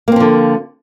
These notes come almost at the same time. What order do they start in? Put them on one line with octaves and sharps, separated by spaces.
A#3 C4 F3 D3